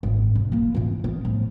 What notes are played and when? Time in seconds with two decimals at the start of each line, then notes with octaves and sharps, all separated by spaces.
0.03 G#1
0.35 E1
0.52 A#3 E4
0.75 A#2 E3
1.04 B3
1.25 A2 F3